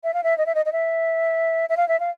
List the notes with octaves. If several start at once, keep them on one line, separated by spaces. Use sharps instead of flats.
E5
F5
E5
D#5
E5
D#5
D#5
E5
E5
F5
E5
F5